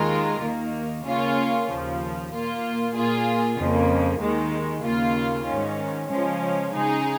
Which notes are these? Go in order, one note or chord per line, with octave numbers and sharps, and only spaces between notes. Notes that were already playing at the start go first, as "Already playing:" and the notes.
Already playing: D#2 D#3 G#3 F4 A#4
D#2 D#3 A#3
C#3 A#3 C#4 F4
D#2 C#3 F3
A#2 A#3 F4
A#2 A#3 F4 G#4
F2 C#3 A#3
D#2 D#3 G#3
D#2 C#3 A#3 F4
G#2 D#3 C#4
C#3 F3 G#3 C#4
C#3 G#3 D#4 G#4